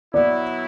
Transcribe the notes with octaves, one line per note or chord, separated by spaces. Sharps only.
B2 F#3 B3 E4 D5